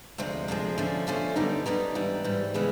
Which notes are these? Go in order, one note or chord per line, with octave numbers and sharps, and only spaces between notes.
D2 C3 F3 G#3
D2 C3 F3 G#3
D3 F3 A3 C#4
D3 F3 A3 C#4
F#2 D3 G3 B3 D#4
F#2 D3 G3 B3 D#4
G#2 E3 G3
G#2 E3 G3
C#3 E3 G#3 B3